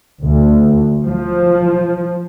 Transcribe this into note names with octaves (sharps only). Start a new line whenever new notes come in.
D2
F3